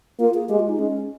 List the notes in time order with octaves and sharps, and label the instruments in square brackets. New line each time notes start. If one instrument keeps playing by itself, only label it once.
[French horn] A#3 [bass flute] F4
[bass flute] G#4
[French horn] G#3 [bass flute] G4
[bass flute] F4
D#4
[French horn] G#3 [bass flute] C#4